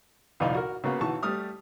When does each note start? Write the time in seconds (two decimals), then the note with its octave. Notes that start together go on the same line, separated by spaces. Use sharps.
0.40 C2 F2 A#2 D#4 F4 D5
0.54 F#4 A#4
0.84 C#3 A#3 B3 F#4
1.01 B1 E3 F#4 A5 C#6
1.23 G3 A3 D#6 F6